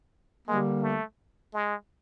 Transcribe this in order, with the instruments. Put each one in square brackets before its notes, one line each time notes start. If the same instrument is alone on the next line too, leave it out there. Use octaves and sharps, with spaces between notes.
[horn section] D3 G3 A#3 [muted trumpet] G#3
[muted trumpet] A3
G#3